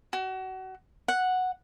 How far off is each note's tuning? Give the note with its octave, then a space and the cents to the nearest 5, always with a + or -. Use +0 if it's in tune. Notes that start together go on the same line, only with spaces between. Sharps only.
F#4 +30
F#5 -5